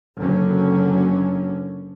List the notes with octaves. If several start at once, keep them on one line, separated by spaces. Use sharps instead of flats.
F#1 D3 F#3 C#4